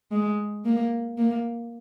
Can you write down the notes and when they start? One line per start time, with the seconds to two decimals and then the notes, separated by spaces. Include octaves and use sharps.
0.11 G#3
0.65 A#3
1.18 A#3